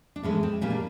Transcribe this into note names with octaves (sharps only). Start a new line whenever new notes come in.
D4
A2 E3 G#3 B3 C#4
C4
A#2 G3 A#3 C#4
D4